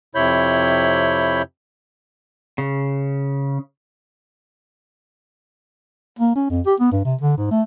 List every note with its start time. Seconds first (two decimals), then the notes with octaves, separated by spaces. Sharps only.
0.15 F2 C3 E4 C#5 B5 G6
2.58 C#3
6.19 A#3
6.35 C#4
6.50 F2
6.66 G4
6.80 B3
6.92 G2
7.05 C3
7.21 D3
7.37 G#2
7.51 A3